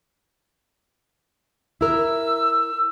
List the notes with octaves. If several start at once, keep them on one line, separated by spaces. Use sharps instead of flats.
E4 A#4 E6